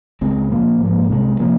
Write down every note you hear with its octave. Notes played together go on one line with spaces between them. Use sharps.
C#2 C#3 G#3 C4
A#2 F3 A#3
G#2 F3 A#3
C2 C3 F3 G#3
C3 F3 A#3 C#4